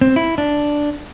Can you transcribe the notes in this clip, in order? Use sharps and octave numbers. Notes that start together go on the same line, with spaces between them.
C4
E4
D4